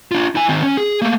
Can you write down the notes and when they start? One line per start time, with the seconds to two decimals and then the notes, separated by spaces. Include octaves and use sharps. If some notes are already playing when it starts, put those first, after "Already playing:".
0.11 D4 F4
0.35 E4 G#5
0.49 D#3 C4
0.63 C#4
0.77 G#4
1.02 A3 A#3